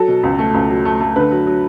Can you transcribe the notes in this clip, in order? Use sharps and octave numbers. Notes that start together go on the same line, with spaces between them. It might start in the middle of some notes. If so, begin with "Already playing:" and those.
Already playing: F#3 A4
B2
C#2
A3
C#2
F#3
A3
A3
D3 B4
F#3
F#3